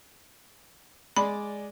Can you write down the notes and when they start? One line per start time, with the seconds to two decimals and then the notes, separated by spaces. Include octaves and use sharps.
1.16 G#3 D5 B5